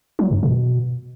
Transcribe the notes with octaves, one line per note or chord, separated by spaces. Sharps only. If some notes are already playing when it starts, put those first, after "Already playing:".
F#3
F#2
B2